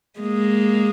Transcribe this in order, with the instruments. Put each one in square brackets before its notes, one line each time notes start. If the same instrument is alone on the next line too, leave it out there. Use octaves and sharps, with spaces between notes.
[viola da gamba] G#3 A#3